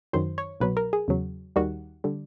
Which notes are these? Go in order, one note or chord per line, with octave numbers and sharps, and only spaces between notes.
F#2 D#3 F#3 C5
C#5
C2 B2 F#3 B4
A#4
G#4
E2 C#3 F#3
D#2 D#3 G3 F#4
D3 G3